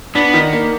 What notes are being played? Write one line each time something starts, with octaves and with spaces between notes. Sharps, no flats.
B3 D4
D#3
A#3